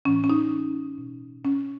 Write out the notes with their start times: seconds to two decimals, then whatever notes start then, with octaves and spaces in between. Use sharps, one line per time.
0.05 A2 E3 C#4
0.24 C#4
0.30 D#4
0.98 B2
1.45 C#4